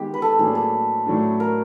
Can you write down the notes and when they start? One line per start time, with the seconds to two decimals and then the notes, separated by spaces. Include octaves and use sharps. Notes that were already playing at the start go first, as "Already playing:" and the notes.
Already playing: D#3 G#3 B3 D#4 G4 G#4
0.14 B4
0.22 A4
0.39 A2 F#3 A#3 D4 G#4
0.55 A4
1.06 A2 F#3 A3 D4
1.40 A#4